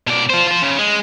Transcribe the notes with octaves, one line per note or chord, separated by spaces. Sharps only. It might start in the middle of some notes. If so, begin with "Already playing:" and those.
B2 D5
F4 C5
F4 C5
C#3
G#3